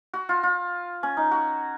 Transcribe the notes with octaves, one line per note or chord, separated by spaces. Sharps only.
F#4
F4
F4
C#4
D#4
F#4